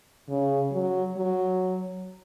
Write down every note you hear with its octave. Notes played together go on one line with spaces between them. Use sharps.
C#3
F#3
F#3